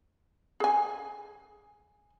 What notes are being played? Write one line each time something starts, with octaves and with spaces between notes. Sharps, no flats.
G#4 G#5